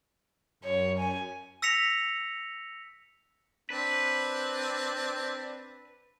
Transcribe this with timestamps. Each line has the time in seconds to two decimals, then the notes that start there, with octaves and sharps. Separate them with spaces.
0.64 F#2 C#5
0.99 G#5
1.62 E6 A#6 B6 C#7 F7
3.70 C4 D4 B4